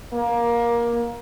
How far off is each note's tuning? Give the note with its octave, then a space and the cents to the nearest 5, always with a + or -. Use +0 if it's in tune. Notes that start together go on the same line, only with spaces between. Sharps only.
A#3 +20